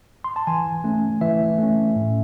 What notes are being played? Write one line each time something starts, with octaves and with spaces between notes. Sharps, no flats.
C6
A5
E3 G#5
A3 C#4
E3 E5
A3 C#4
A2